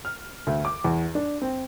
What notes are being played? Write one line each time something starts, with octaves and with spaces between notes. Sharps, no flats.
F6
D2
D6
E2
D4
C4